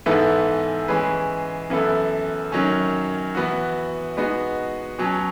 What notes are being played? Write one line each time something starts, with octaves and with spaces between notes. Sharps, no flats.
G#2 E3 B3 E4 A4
E3 G#3 C#4 G#4 B4
F#2 E3 B3 E4 A4
F#2 D#3 F#3 C#4
E3 B3 F#4
G#3 B3 D#4 F#4
B2 F#3 C#4